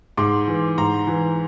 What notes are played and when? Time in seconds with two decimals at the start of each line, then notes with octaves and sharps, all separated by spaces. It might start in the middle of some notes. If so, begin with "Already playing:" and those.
0.17 G#2 C6 D6
0.48 E3
0.78 G#2 A#5 C6
1.07 E3